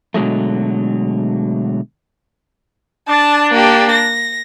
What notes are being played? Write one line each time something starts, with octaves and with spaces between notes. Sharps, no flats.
B2 D3 F#3 G#3 A3
D4 A5
A#3 G4
A#6